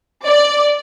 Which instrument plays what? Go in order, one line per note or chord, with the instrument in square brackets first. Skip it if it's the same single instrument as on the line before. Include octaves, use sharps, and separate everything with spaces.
[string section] D5